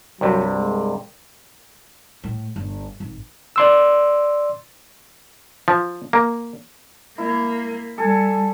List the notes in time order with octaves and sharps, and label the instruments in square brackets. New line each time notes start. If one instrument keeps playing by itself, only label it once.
[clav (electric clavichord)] C2 G2 C3 [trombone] F#3
[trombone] G#3
[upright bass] A2
G1
G#1
[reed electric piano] D5 C6 E6
[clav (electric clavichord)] F3
A#3
[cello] A#3 [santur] E4
[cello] G3 [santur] A4 G#5